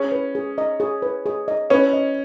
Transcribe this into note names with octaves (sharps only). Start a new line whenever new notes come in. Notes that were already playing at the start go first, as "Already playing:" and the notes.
Already playing: C#4 G#4
B4
G#4
D#5
G#4
B4
G#4
D#5
C#4 B4
D#5